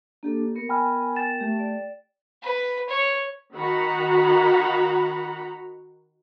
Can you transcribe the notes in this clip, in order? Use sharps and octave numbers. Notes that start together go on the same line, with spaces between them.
A#3 D4 G4 A4
B3 A#4 C#7
G5 G#5 B5 F6
G5 A6 E7
A3 G4 A5
D5
B4
C#5
D#3 F#4 F#5 A#5 B5